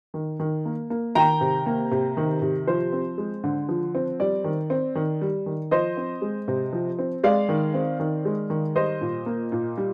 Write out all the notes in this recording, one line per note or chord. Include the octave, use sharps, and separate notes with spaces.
D#3
D#3
A#3
A#3
D#3 G5 A#5
C3
A#3
C3
D#3
C3
F3 C5
C4
G#3
D3
F3
C4
G3 D5
D#3
C4
D#3
G3
D#3
F3 C5 D#5
C4
G#3
C3
F3
C4
G#3 D5 F5
D#3
C4
D#3
G#3
D#3
G3 C5 D#5
A#2
A#3
A#2
G3